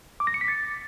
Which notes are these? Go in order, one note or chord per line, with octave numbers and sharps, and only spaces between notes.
D6
A#6
C#7
B6
A6